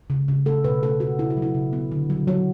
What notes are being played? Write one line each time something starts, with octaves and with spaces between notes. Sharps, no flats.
C#3
C#3
A3 A4
B2 B4
A3 A4
A3 F#4
C#3 E4
F#4
F#3
E4
C#3
B3
D3
F#3
F#3